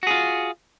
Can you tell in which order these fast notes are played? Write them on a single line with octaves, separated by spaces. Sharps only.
F#4 G#4 F4